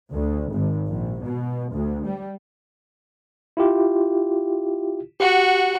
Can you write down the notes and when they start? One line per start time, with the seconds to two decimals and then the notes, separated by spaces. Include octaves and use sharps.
0.13 D2
0.52 G#1
0.88 A#1
1.25 B2
1.73 D2
2.06 G3
3.57 E4 F4 G4
5.20 F#4 G4 F#5